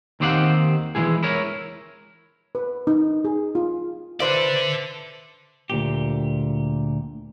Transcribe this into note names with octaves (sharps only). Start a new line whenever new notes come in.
D#2 D#3 C4 G4 F5 F#5
E3 F3 G#3 E4 G#4
E4 A#4 C#5
B4
D#4
G#4
F4
A4 B4 C5 D5 E5
D2 A#2 G4